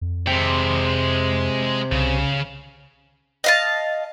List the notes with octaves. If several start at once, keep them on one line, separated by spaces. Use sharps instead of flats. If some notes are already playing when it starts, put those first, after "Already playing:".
F2
C3 G#3 G5
C2 C#3
D#5 F5 A5